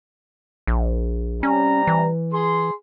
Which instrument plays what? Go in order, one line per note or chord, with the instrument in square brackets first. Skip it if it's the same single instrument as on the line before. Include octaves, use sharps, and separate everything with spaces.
[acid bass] A#1
[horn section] C3 G3 A#5 [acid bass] C#4
[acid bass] E3
[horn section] G#4 C6